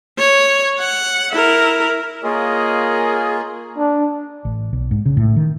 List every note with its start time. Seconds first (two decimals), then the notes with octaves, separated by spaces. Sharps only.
0.19 C#5
0.79 F#5
1.32 E4 A#4
2.24 A#3 F4 G#4 A#4 C#5 D#5
3.78 D4
4.45 A1
4.73 B1
4.91 G#2
5.05 C#3
5.17 A2
5.36 D#3